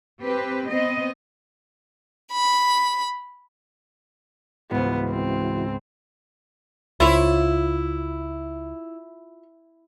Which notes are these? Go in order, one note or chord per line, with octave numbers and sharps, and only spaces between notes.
C4 G4 B4
B3 C4 D#5
B5
C#2 G#2 E3 B3 E4 F#4
C4
C#2 E4 F4 C#5